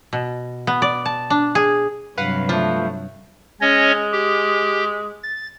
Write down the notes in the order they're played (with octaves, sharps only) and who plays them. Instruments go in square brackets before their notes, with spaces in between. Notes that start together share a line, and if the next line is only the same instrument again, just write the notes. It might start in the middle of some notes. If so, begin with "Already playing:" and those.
[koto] B2
B3
D5
A5
D4
G#4
[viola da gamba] G2 C3 F#3 [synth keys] B4 F5 F#5
[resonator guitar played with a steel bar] F3 [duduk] A3
[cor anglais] G#3 [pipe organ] C#4 C#5 D#5
[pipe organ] G4
A6